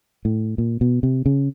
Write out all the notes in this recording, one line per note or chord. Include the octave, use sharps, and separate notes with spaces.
A2
A#2
B2
C3
C#3